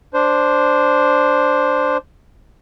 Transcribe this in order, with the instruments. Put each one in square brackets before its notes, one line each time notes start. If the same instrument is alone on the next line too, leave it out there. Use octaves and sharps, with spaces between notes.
[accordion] D4 C5